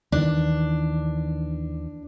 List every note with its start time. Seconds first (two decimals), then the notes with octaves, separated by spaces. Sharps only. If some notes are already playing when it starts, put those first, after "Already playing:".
0.12 D#2 D#3 E3 D4